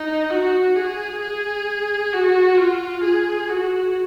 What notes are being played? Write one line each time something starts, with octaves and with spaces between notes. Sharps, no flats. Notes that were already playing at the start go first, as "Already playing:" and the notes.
Already playing: D#4
F#4
G#4
G#4
F#4
F4
G#4
F#4